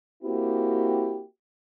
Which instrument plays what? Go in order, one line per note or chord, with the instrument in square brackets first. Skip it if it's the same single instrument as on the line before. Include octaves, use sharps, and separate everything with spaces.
[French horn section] A#3 C4 E4 F#4 G4